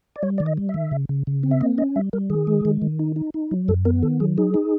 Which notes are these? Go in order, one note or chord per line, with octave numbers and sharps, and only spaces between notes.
D5
G3 C#5
D#3 D5
D#5
G3
E5
D#3
C#3
C#3
C#3
C4
E5
A#3 D#5
C#4 D#5
G3 E5
G3 A#4
D#3 G#4
G#3
D#3
D#3
D#4
D#4
D#4
F#3
F#2 A4
B3 A#4
D#3 A4
F#3 G#4
D#4 G#4
D#4